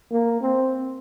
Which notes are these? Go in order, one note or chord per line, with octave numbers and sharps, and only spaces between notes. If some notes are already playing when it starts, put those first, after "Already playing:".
A#3
C4